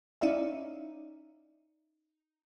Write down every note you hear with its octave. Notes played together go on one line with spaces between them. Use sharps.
C#4 D#4 E4 D5 E5 F5